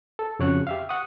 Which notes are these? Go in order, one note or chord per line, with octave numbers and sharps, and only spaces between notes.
A4
F2 C#3 F#4 C#5 C#6 F#6
G4 E5 F5
F#5 C#6 D#6